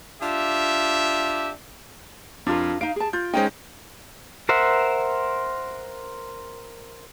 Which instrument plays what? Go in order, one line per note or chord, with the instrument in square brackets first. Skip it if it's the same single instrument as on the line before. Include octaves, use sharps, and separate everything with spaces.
[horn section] D4 F4 G4 E5
[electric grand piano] F2 [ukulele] D4 F4 A#4
[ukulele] D#4 F5 [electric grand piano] D7
[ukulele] G#4 A5
[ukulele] F4 [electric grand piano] G6
[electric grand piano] G#3 C#4 D#4 [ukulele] C5 G5
[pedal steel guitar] A#4 C5 E5 F#5